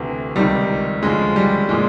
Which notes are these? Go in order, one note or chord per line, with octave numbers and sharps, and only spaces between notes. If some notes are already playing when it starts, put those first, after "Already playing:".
Already playing: D2 C3 E3
C#2 C3 D#3 G3
D2 C#3 F3 G#3
G3
A#2 F3 G#3